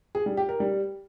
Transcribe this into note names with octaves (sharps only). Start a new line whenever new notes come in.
G#4
G3
G4
A#4
G3